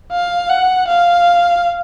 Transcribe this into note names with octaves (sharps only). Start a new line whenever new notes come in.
F5
F#5
F5